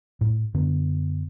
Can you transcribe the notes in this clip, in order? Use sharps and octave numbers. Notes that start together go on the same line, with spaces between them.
A2
F#2 D3 B3